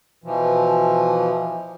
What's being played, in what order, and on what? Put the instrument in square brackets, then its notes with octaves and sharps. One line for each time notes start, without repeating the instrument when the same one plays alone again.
[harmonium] B2 E3 F3